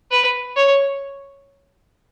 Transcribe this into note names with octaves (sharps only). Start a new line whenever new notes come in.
B4
C#5